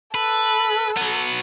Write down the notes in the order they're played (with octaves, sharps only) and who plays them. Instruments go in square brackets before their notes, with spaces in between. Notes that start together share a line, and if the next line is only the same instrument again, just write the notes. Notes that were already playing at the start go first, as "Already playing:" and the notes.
[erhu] A4 [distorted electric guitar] B4
[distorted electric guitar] F#3 B3